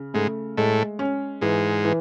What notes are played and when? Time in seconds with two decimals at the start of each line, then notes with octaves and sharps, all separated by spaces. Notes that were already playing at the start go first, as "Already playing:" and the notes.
Already playing: C#3
0.14 G#2 A3
0.57 A2 G#3
0.99 C#4
1.41 G#2 E3
1.85 E3